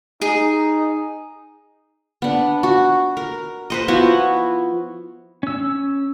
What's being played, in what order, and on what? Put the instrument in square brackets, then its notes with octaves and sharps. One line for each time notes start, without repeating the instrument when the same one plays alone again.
[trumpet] D#4 [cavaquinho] G#4
[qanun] B3 D4
F#4
A#4
B4 C5 D#5
F3 B3 E4 F#4
[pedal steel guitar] C#4 E6